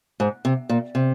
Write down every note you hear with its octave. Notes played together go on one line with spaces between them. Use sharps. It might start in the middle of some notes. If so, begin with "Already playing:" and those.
G#2
C3
A#2
C3